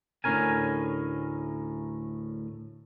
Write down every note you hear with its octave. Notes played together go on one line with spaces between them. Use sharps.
D2 A2 C#4 A#4 G#5